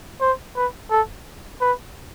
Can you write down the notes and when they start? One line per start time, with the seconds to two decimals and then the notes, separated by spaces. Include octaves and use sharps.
0.21 C5
0.56 B4
0.91 A4
1.61 B4